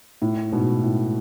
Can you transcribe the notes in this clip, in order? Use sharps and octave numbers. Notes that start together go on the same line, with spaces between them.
A2
G#2 B2
A2